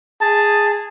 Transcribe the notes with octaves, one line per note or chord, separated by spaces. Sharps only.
G#4 A5